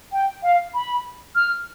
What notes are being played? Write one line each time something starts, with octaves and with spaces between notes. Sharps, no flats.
G5
F5
B5
F6